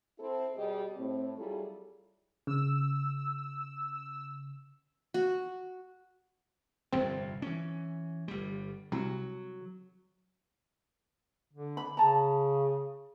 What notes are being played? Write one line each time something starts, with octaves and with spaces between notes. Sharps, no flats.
C4 E4 A4
B2 G3 G4 G#4 D#5
A2 C4
F#3 G3 E4 F4 G#4 A4
C#3 E6
F#4
G1 C2 F2 C4
E3 C#4
G1 G3
C2 F#3
D3
B5
C#3 A5 A#5